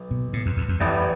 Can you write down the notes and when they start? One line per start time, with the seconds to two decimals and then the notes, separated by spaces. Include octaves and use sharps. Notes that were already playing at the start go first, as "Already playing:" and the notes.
Already playing: B1
0.11 B2
0.33 A2
0.46 F2
0.57 E2
0.69 F2
0.80 A1 F2 A2 E3 G3 B3